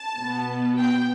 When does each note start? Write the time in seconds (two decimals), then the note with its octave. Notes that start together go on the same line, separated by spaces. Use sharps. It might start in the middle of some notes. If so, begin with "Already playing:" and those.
Already playing: A5
0.17 B2 B3
0.76 G5